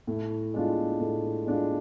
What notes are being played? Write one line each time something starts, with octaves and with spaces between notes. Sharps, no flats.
A2
G#3 D4 F4
A2
G#3 D4 F4